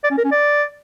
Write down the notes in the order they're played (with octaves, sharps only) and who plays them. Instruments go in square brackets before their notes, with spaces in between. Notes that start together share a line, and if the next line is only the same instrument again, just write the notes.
[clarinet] D5
C#4
A#4
C#4
D5